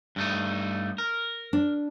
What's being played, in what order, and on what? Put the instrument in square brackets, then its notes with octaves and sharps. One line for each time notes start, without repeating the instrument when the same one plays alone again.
[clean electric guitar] G2 A3 D#4
A#4
[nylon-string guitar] D4